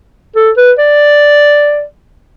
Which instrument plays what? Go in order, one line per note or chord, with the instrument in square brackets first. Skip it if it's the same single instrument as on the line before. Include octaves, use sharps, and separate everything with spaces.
[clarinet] A4
B4
D5